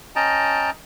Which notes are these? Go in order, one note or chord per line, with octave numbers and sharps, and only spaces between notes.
C#4 D#5 G5 A5 A#5